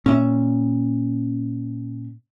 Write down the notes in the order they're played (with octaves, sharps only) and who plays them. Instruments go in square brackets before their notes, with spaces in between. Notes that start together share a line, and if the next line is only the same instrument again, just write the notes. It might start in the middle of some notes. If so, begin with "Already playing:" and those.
[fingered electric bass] A#2 [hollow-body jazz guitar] C#4 E5